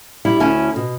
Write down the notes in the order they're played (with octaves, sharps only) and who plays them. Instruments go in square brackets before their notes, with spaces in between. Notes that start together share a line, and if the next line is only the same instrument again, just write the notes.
[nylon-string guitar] G3 E4
D2 C#4 E4 G#5 A5
B2